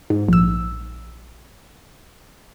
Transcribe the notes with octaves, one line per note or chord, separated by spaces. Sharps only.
G#2
A#1 E6